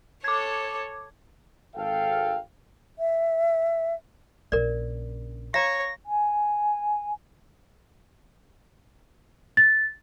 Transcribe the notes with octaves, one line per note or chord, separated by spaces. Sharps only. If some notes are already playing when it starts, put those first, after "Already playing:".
A4 C#5 D6 G#6
G#1 A4 F5 G5
E5
A#1 C#3 A#4 D5
C#5 F5 A#5 A#6
G#5
A6